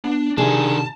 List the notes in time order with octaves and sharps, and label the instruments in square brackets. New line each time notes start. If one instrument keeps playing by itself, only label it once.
[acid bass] B3 [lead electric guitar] D4
[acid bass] C3 [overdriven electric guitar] D#3 D4 [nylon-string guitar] G#4 [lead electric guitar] A5